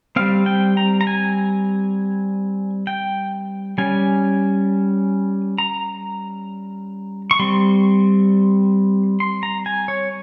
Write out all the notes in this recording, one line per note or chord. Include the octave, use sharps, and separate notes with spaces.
G3 C4 F5
G5
A#5
A#5
G#5
G5
G3 C#4 G#5
A#5
C#6
G3 C4 C6
C6
A#5
G#5
C#5